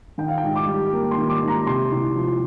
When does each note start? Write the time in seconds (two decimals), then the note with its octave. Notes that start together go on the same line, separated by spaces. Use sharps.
0.18 D#3 G5
0.28 F5
0.38 G5
0.43 G#2
0.56 D6
0.67 G3
0.93 A#3
1.11 C6
1.17 D#3
1.29 D6
1.42 G#2
1.48 A#5
1.67 C3 C6
1.92 C2
2.16 F3